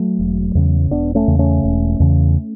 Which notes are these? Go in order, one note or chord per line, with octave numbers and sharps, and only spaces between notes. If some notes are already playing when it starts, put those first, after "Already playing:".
Already playing: F#3 A3
E1
E2 C#3
E1 B3 D4
A3 C#4
E2 C#3
A3 C#4
E1
E2 C#3